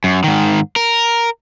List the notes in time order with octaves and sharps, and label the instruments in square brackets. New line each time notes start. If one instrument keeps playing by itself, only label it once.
[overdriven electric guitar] F#2
G#2 D#3
A#4